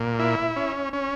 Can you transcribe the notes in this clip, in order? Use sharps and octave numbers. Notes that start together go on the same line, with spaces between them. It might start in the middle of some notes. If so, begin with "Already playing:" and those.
Already playing: A#2
E4
C#4
C#4